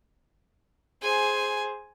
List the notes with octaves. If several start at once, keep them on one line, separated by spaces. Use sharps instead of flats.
G#4 C5 G#5